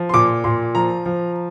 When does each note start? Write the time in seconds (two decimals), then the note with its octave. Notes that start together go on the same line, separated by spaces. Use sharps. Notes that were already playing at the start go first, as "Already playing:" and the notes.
Already playing: F3
0.09 C6
0.14 A#2 D6
0.44 A#2 C6
0.75 F3 A#5
1.06 F3